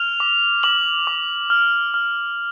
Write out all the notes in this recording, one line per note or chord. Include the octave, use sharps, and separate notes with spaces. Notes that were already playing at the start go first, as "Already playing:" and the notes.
Already playing: F6 F7
D6
D6 F#7
D6
F6
F6